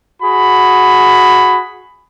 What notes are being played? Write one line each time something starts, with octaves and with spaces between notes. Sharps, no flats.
F#4 G#4 B5